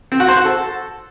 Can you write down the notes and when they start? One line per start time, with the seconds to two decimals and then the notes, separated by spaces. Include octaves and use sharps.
0.12 C4
0.20 F#4
0.28 C5
0.37 F#4
0.45 A4